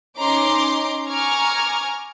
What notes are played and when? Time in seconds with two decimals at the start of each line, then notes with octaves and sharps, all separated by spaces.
0.18 C#4 D#4 A#5 C6 D6
1.08 G#5 A#5 C#6 D6 F6 G#6